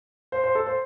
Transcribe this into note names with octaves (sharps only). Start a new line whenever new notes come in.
C5
C5
A4
C5